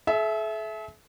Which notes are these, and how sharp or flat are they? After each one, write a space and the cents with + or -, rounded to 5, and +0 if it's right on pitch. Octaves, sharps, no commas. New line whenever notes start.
A4 -45 E5 +0